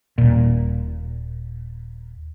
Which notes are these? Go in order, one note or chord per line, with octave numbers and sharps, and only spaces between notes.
D#1 A#2